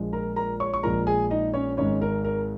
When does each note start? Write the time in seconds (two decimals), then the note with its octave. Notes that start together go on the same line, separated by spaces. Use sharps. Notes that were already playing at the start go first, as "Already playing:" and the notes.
Already playing: A#1 A#2 F3 G#3
0.13 A#4 A#5
0.36 A#4 A#5
0.60 C#5 C#6
0.74 C#6
0.83 A#1 A#2 F3 G#3 A#4 A#5
1.07 G#4 G#5
1.31 D#4 D#5
1.54 C#4 C#5
1.77 G#1 G#2 G#3 C#4 C#5
2.02 A#4
2.25 A#4